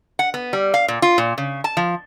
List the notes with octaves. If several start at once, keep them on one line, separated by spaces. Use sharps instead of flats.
F#5
B3
G3
F5
A#2
F4
A#2
C#3
A5
F3